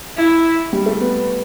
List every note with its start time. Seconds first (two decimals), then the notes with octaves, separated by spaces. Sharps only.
0.17 E4
0.73 G3
0.86 A3
1.01 B3